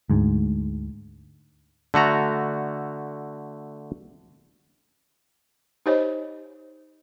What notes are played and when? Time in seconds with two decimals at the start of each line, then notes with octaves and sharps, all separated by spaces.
0.10 D2 G#2
1.94 D3 A3 F#4 A#5
5.86 D#4 G4 C5 C#5 D#5